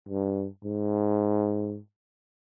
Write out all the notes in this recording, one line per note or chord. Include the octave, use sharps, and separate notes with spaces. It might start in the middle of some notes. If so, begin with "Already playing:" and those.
G2
G#2